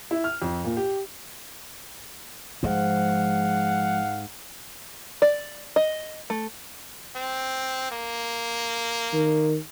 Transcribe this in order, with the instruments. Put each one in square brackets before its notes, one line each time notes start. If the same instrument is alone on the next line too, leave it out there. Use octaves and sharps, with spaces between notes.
[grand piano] E4
F6
F2
A#2
G4
[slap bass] G#2 [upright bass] F3 G#3 [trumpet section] F5 F#5
[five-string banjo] D5
D#5
A3
[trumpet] C4
A#3
[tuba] D#3